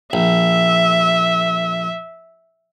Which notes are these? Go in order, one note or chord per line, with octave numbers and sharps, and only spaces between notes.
A#1 E5